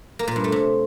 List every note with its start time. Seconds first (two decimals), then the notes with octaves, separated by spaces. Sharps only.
0.19 A#3
0.28 A#2
0.36 G2
0.44 A3
0.52 C3